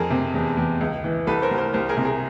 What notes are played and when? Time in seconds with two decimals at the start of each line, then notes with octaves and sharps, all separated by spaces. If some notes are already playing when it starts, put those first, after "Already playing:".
Already playing: F2 G#4 A#4
0.10 C3
0.34 E2
0.57 E2
0.81 C#2
1.04 E3
1.27 C2 A4 B4
1.42 A#4 C5
1.51 C2
1.58 A#4 C5
1.73 C2 A#4 C5
1.89 G#4 A#4
1.97 C3
2.05 G#4 A#4